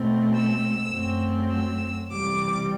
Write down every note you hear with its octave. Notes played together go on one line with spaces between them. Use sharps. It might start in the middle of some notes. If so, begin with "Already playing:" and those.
Already playing: B2 A3 C4
E6
F#2 F#3 A3 C4
E6
C3 E3 G3 D6